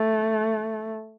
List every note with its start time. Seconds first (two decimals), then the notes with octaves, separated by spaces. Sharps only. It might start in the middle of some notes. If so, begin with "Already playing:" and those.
Already playing: A3